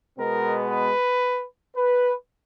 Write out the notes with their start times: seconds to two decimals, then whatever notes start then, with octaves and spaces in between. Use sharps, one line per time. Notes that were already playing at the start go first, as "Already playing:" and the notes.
0.18 B2 G#3 B3 A#4
0.70 B4
1.76 B4